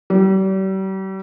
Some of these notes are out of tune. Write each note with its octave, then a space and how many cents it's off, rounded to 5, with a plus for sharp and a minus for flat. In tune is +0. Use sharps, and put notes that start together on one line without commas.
G3 -40